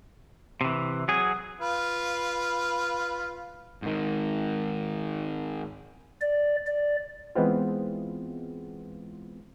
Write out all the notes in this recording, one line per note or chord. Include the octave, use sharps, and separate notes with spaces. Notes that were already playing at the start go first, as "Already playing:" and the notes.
C3 E3
F#3 G#4
F4 B4
G#2 D#3
D5
D5
E3 G#3 B3 C4 F4